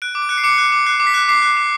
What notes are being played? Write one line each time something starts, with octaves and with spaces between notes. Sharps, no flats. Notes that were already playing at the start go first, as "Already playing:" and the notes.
F#6 D7
D6
D7
F#6 C#7
C7
D6 C#7
F#6
D6
F#6 C7
D6
B6
F#6
D6 C7
F#6
D6